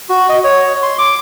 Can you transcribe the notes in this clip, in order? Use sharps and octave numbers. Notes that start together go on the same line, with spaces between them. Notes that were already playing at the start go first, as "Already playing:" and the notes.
F#4
D#5
C#5
C6
D6